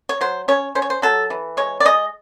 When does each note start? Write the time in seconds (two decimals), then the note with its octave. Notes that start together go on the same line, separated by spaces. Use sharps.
0.09 C#5
0.21 F#3 C5
0.48 C#4 C#5
0.75 C#4 C5
0.82 C#5
0.90 C5
1.02 F#3 A4
1.30 E3
1.57 G#3 C#5
1.80 D5
1.85 G#3 D#5